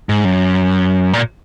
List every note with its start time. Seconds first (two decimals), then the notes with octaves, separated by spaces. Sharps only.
0.09 G#2
0.25 F#2
1.13 A#2